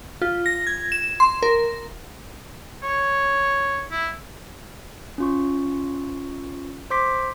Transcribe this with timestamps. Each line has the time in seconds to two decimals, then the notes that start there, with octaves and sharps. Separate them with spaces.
0.22 F4
0.46 A#6
0.67 G#6
0.92 E7
1.20 C6
1.43 A#4
2.83 C#5
3.91 E4
5.18 C#4 F4 C#6
6.90 C5 C6 D6 B6